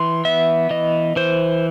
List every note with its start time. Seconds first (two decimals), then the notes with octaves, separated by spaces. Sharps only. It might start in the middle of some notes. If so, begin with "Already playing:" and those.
Already playing: E3 C6
0.25 B3 E5
0.70 E3 D#5
1.16 E3 C5